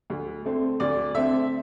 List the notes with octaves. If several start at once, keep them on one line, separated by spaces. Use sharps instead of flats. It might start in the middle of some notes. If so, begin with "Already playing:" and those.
D2
D3 A3 C4
D2 D5
D3 A3 C4 E5